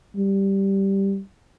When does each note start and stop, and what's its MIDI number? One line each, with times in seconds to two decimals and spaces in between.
0.16 1.20 55